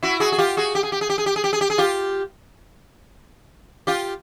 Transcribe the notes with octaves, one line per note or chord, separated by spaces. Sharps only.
E4 F#4
F#4 G#4
G#4
F4 G4
F#4 G#4
G4
G#4
G4
G#4
G4
G#4
G4
G#4
G4
G#4
G4
G#4
F4 G4
F4 G4